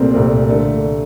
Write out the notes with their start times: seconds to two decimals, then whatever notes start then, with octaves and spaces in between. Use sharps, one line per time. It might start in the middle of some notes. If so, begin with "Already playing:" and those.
Already playing: C2 A#2 A3 C4
0.14 C2 A#2 A3 C4
0.49 D3 A3